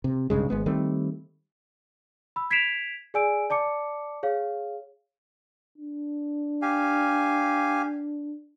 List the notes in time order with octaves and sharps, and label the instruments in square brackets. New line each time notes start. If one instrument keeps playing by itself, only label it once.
[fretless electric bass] C3
B1 G2 C#3 G#3
G#1 G#3 B3
D#3 G3 A3 C4
[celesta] B5 E6
G#6 B6 C7 D7 E7 F7
G#4 D5 G#5 E6 D7
D5 A5 D6 C#7
G#4 C#5 F5
[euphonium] D4
[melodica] G4 F5 G#5